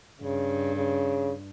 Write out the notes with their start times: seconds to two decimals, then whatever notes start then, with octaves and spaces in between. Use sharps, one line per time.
0.22 G2 C#3
0.76 C#3